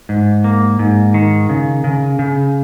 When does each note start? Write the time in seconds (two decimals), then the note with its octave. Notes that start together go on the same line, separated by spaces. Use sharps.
0.09 G#2
0.44 A#3
0.79 G#2
1.14 D#3
1.49 C#3
1.84 C#3
2.19 C#3